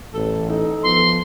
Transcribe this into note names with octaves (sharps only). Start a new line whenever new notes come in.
A1 A4
D#4 A4
F3 B3 C6